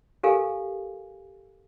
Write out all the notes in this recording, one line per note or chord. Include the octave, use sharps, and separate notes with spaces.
G4 A4 A#4 F5 G#5